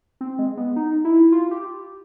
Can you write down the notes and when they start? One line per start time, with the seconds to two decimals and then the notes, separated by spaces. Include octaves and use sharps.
0.21 C4
0.39 G#3
0.57 B3
0.76 D#4
1.05 E4
1.32 F4
1.51 G4